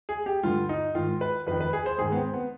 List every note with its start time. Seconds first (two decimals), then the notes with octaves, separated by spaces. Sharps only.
0.09 G#4
0.26 G4
0.43 G2 D3 F4
0.69 D#4
0.95 G#2 D#3 F4
1.21 B4
1.47 F2 D#3 B4
1.60 B4
1.73 G#4
1.86 C5
1.98 G#2 D#3 G#4
2.12 B3
2.16 C4
2.33 B3